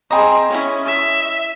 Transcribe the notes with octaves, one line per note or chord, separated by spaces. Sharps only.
C4 G#4 D#5 G#5 A#5 C6
C#4 E4 F#4 C#5
E5